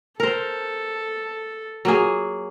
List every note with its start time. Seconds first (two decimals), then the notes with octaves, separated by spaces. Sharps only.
0.20 A4 A#4 C5
1.85 F#3 A#3 G#4